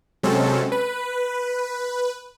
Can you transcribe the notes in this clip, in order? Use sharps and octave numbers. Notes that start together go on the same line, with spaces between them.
C3 F#3 G#3 C4 C#4 A4
B4